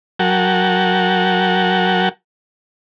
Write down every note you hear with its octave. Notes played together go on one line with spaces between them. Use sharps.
F#3 F#4 A#4 F#5 G5 A5